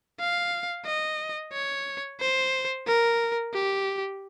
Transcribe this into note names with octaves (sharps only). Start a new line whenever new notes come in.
F5
D#5
C#5
C5
A#4
G4